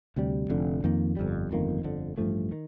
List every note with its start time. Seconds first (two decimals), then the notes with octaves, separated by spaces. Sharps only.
0.16 D2 C3 G3
0.50 F1 F2 D3
0.84 F2 D#3 A#3
1.17 G1 F2 D3 G3
1.51 G1 F2 D#3 A#3
1.84 G1 F2 D3
2.17 A1 G2 F3 A3
2.52 D#3